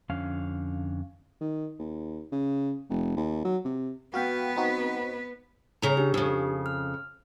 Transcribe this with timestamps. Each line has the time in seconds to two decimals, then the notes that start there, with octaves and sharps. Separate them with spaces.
0.09 F2 D3 C#4 F5
1.41 D#3
1.79 D#2
2.32 C#3
2.90 F1
3.16 D#2
3.45 F#3
3.65 C3
4.14 B3 F#4 B4 F5 G5
4.56 C4 D#4 F#4
5.82 C#3 A#5
5.97 D4 G4
6.14 F2 C#3
6.66 F6